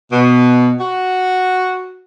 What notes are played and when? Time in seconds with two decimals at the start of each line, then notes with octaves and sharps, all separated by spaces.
0.12 B2
0.80 F#4